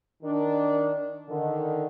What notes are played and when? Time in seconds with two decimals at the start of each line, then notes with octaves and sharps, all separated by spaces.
0.23 D#3 D4 A#4
1.29 D3 D#3